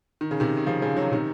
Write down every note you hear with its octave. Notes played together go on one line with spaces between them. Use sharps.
D#3
C#3
C3 D#3
D#3
C#3 F3
C#3 F3
D#3 F#3
C3 D#3